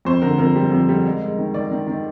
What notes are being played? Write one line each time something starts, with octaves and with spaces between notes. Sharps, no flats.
F2 C5
D3 A#4
F2 A#4
G3
F2
G3
G#3
G#3
D#3
D#3 D5
D#3
D#3